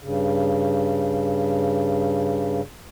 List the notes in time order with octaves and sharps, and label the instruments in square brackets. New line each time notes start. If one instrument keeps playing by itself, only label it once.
[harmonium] G2 C#3